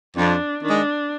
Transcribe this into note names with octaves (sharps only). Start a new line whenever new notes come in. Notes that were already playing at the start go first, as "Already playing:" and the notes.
F2 D4
D#3 G#3 D4